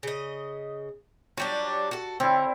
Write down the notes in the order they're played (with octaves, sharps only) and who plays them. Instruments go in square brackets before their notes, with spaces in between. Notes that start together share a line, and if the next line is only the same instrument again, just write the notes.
[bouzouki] C#3 D#5
[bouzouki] F#3 G3 D4 [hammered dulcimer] C#6
[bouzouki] F#4 A4
[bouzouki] D3 [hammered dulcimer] C4 E4